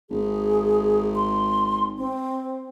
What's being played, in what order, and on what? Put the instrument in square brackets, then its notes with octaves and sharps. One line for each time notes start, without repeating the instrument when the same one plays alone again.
[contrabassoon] G#1 [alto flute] G#4
[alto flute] C6
C4